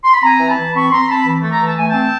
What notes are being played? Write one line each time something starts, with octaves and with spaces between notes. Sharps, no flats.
C6
B5
C4 G#5 A#5
E3
A5 B5
E3
C4 B5 C#6
C4 A#5 C6
C4 A5 B5
E3
A3
A#5
E3 A5
A3 G#5
G5 A5
C4